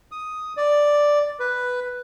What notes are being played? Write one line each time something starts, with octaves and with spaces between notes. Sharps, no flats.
D#6
D5
B4